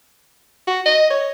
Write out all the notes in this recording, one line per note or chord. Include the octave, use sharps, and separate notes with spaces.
F#4
D#5
C#5